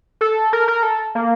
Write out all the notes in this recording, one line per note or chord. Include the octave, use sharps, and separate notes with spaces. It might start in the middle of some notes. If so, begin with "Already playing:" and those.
A4
A#4
A#4
A4
A#3